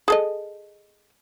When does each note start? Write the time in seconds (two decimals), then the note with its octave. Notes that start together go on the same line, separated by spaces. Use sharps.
0.08 G#4 A4 D#5